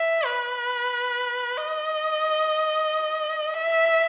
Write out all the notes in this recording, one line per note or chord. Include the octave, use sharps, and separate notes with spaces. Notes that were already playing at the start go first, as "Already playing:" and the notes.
Already playing: E5
B4
D#5
E5